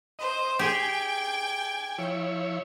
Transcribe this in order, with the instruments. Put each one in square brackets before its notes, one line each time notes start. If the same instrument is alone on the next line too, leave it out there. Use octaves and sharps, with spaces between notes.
[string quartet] C5 [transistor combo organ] D#5
[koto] G4 G#4 [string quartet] G5 [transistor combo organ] G#5
[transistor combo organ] F3 E4 C#5